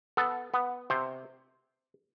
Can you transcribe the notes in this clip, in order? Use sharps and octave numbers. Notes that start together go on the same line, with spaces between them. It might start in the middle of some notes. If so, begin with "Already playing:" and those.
B3 A4
B3
C3 C5